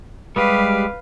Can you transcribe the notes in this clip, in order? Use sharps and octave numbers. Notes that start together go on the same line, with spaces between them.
G3 G#3 G4 B4 F5